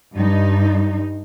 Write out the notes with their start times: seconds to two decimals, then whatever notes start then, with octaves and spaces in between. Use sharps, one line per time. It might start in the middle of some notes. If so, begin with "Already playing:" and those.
0.16 G2 D#4